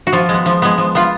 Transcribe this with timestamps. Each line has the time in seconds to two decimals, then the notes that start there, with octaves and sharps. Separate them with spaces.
0.07 F#4
0.13 F3 F4
0.29 G#3
0.34 B3
0.46 F3
0.62 G#3 B3
0.78 F3
0.95 B3 F4